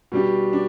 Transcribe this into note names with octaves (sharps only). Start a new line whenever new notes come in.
B2 G3 D4 G4
D4